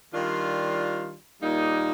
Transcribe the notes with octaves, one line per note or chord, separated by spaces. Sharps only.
D#3 G3 D4 F4
A#2 G3 A#3 D#4